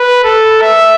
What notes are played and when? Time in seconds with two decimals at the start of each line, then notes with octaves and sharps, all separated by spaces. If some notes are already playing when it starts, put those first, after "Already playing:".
Already playing: B4
0.24 A4
0.61 E5